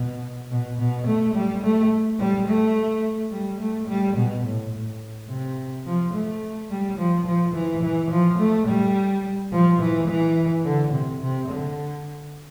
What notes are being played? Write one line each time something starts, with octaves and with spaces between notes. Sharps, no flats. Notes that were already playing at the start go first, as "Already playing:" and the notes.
Already playing: B2
B2
B2
A3
G3
A3
G3
A3
G3
A3
G3
B2
A2
A2
C3
F3
A3
G3
F3
F3
E3
E3
F3
A3
G3
F3
E3
E3
D3
C3
C3
D3